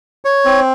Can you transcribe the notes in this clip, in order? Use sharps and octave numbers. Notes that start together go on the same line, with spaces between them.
C#5
C4